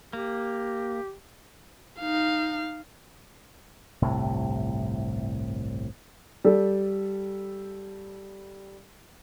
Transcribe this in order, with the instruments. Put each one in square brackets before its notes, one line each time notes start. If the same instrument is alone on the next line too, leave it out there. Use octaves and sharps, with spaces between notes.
[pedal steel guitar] A#3 [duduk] G4
[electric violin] D#4 F5
[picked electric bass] G1 C2 A2 C3
[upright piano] G3 A4